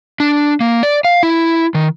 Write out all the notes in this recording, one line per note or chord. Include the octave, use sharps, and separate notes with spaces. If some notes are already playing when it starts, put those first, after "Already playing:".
D4
A#3
D5
F5
E4
D#3